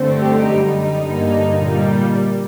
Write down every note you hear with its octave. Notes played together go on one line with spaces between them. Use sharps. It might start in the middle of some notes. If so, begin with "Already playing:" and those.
Already playing: G2 D3 A3 C4
G4
F#2 D3 G3 D#4
G2 D3 G3 A#3
A#2 G3 A#3